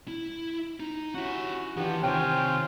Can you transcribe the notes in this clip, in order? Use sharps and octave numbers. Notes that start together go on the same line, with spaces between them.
E4
D#4
C#4 E4 F#4 G4 F#5
D#3 E3 B3 D4 F4 G4
C3 D#3 F4 C5 C#5 G5 G#5